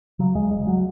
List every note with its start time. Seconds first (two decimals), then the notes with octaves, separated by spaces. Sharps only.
0.19 C#3 F#3
0.35 D#2 G#3
0.51 E1 G#3
0.67 F#3